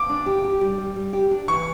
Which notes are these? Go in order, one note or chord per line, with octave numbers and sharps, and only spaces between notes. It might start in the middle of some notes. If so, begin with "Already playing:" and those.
Already playing: D6
D4
G4
G4
G3
G3
G3
G4
D4
E3 C#6